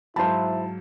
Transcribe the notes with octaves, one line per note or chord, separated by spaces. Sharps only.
G#2 F#3 E4 C5 F5 A5 B5